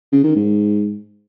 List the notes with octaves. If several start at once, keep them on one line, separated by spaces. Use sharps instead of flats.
C#3
D#3
G#2